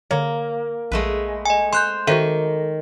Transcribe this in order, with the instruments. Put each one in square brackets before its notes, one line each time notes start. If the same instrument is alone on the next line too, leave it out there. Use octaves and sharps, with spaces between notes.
[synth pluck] D3 C#5 [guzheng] A#3
[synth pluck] A#1 [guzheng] G#3 A3 B4
[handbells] D#5 G#5
[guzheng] C5 [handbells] C6 F#6 G6
[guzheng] D#3 [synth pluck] F#4 C5 E5 [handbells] A4